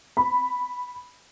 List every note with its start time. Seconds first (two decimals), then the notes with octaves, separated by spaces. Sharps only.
0.17 B5